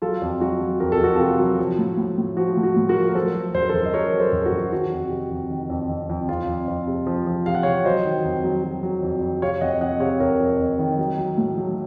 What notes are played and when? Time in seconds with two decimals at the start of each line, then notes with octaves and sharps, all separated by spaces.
0.02 F#3 F4 A4
0.22 F2
0.41 F#3 F#4
0.61 F#3
0.80 F2 A#4
0.92 A4
1.00 F2 F#4
1.16 C3 F4 A4
1.39 F#3
1.59 F3
1.79 A2
1.97 A2
2.18 A2
2.37 F3 F#4
2.57 A2
2.63 F#4
2.76 A2
2.89 F#4 A#4
2.96 F3
3.09 A#4
3.15 F#3 A4 C5
3.35 F#3
3.54 F#2 C5
3.62 A#4
3.69 A4 C5
3.74 F#2
3.85 D#5
3.93 F#3 A#4 C#5
4.13 F#3
4.20 A4 C5
4.33 F#2
4.41 A4
4.46 F#4
4.52 F#2
4.72 D#3 F#4
4.92 F2
5.11 C3
5.30 F2
5.50 D#3
5.70 F2
5.89 F2
6.09 F2
6.29 F2 F4
6.48 F2
6.68 F2
6.87 C3
7.06 F3
7.27 F3
7.46 C3 F5
7.54 F#5
7.63 C3 C#5 F5
7.85 F#3 C5 D#5
8.05 D#3
8.24 F2
8.44 F#3
8.64 F#3
8.83 F#3
9.03 F2
9.22 F2
9.42 C3 C#5 F5
9.61 F2 D#5 F#5
9.81 F2 D#5 F#5
10.00 C3 C#5 F5
10.20 F2 A#4 C#5
10.40 F2
10.59 F2
10.79 D#3
10.98 F#3
11.18 F#3
11.38 A2
11.57 F#3